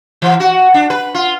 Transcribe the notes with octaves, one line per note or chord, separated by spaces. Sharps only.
E3
F#4
D4
B4
F4